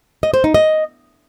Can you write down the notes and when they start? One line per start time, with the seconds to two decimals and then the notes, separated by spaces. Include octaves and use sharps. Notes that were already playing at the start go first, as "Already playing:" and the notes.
0.23 D#5
0.34 C5
0.44 D#4
0.54 D#5